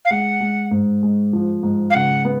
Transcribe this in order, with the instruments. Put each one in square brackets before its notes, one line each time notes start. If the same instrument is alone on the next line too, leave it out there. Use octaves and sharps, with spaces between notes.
[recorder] F5
[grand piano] G#3 [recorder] F#5
[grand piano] G#3
G#2
G#3
F3
G#2
[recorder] F5
[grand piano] C#3 [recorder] F#5
[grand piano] B3